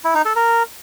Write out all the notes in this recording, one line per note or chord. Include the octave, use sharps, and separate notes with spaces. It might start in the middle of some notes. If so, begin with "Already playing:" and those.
E4
D#4
A4
A#4